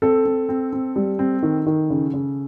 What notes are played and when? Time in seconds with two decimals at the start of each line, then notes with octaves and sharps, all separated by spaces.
0.02 C4 A4
0.25 C4
0.49 C4
0.73 C4
0.96 G3
1.19 C4
1.43 D#3
1.66 D#3
1.90 C#3
2.13 C#3